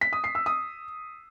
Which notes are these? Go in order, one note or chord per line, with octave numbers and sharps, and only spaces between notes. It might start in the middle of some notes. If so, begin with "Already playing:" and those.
B6
D#6
C7
E6
D#6